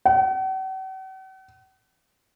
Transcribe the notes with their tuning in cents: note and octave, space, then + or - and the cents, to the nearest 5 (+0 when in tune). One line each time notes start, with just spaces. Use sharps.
F#5 +45